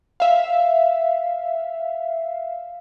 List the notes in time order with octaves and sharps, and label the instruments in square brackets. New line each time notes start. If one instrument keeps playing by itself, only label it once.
[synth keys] E5 F5